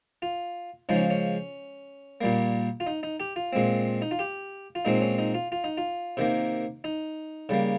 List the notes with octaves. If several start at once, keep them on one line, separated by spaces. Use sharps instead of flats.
F4
C#3 F3 G#3 D#4
C#4
C#4
A#2 G3 A#3
F4
D#4
D#4
G4
F4
A#2 G#3 C4
D#4
F4
G4
F4
A#2 G#3 C4 D#4
C#4
D#4
F4
F4
D#4
F4
C3 D#3 A#3
D#4
C#3 G3 A#3